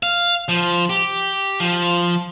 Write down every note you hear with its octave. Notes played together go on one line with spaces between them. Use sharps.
F5
F3
G4
F3